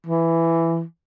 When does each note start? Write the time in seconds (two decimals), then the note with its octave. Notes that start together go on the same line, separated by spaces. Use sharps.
0.06 E3